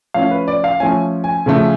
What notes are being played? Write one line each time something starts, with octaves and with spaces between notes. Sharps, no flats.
F3 A3 C#4 F5
B4
D5
F5
F3 A3 C#4 G#5
G#5
C#3 F3 A3